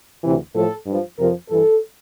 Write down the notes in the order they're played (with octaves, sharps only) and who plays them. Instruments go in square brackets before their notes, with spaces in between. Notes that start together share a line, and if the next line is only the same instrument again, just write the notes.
[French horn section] D2 C3 E3
A2 F3 A4
G2 F3
F2 C3 F3 A#4
G2 E3 A4